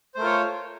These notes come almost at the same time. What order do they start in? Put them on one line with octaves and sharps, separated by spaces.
C5 A3 A#4 F4 C#5